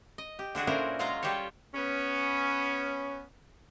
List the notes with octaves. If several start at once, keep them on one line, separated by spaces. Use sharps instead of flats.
D#5
G4
D3 D4 F#4 G#4
A#2 C#4 D4 E4 A#4 C5
F#3 G#3 F4 C#5 F5 A#5
G3 F4 G4 A4 C#5
B3 C#4